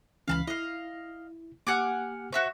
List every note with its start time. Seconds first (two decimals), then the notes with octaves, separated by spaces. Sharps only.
0.28 C#2 E3 C#4 F5 A5 B5
0.47 E4 D#5 F5
1.67 A#3 G4 F#5 G#5 D6 F6
2.32 F#4 C5 E5 C#6